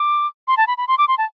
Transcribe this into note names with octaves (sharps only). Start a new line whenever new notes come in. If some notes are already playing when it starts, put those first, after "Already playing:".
Already playing: D6
C6
A5
B5
B5
C6
D6
C6
A5